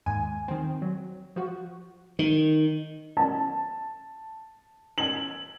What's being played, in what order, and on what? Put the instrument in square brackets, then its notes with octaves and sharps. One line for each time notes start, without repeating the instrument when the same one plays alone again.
[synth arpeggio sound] D#2 G#2 G#5
D#3 C4
F#3
F3 F#4
[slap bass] D#3
[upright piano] A5
F#7